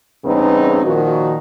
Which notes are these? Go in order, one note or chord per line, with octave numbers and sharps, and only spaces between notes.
E2 G2 C#3 B3 C4 D#4
A#2 D#3 F3 F#4